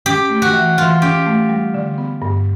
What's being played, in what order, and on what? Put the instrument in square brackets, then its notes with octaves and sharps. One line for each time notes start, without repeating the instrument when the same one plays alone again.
[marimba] C#4 [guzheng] G4
[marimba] A3
[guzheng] F#4
[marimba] E3
[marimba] E3 [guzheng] F4
[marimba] C#4 [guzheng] G4
[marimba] A3
G3
D3
B3
G2